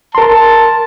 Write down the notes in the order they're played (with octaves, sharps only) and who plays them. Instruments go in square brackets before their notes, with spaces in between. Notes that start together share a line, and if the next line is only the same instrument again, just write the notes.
[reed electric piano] A#4 C6 [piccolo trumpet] A5